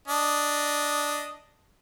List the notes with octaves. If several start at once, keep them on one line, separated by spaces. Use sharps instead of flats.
D4 D#5